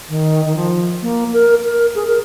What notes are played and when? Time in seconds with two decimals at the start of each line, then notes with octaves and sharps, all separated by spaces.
0.09 D#3
0.45 D#3
0.56 F3
1.02 A#3
1.33 A#4
1.65 A#4
1.95 G#4
2.07 A#4